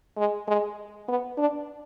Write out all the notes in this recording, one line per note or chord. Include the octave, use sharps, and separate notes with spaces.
G#3
G#3
B3
D4